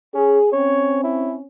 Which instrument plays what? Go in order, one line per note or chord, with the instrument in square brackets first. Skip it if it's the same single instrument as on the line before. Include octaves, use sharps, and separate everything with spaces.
[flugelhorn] C#4 [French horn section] G#4
[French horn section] C4 C#4 [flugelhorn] C#5
[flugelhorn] E4